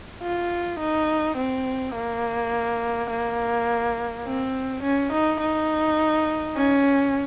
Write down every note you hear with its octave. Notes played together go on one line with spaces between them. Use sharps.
F4
D#4
C4
A#3
A#3
C4
C#4
D#4
D#4
C#4